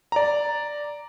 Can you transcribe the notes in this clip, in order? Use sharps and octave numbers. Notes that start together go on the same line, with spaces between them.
D5 A#5